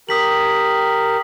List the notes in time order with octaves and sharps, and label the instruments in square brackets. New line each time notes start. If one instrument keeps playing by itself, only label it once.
[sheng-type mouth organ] G4 A#4 [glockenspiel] D#6 B6 F#7